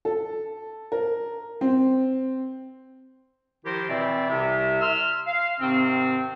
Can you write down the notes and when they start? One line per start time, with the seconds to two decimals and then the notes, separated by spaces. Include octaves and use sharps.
0.05 A4
0.92 A#4
1.61 C4
3.65 D#3 F3 E4 G4 A#4 C5
3.89 B2 E3 C4 D5 E5
4.29 C2 C3 E5
4.81 C6 E6 F6
5.27 F5
5.60 G#2 C3 D#3 C4